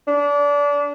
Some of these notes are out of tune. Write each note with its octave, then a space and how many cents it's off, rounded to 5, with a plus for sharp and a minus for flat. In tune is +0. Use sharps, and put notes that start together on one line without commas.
D4 -25